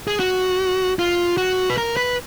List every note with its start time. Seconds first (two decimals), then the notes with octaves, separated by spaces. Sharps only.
0.08 G#4
0.20 F#4
0.99 F4
1.37 F#4
1.70 B4
1.78 A#4
1.97 B4